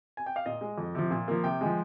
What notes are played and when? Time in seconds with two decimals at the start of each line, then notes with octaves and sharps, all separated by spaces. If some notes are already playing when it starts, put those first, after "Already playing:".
0.17 G#5
0.26 G5
0.36 F5
0.46 A#2 D#5
0.61 G#3
0.78 F2
0.95 C3 F3
1.11 A#2
1.28 F3 A#3
1.44 C3 G5
1.61 F3 G#3